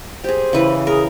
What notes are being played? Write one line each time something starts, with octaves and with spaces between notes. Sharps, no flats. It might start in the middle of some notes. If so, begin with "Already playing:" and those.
G4 G#4 C5
C#3 E3 B4
G#4 A#4